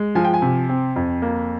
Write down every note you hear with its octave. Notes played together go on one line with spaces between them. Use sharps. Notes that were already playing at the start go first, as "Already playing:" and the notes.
Already playing: G#3
F3 G#5
G5
G#5
C3
C4
F2
A#3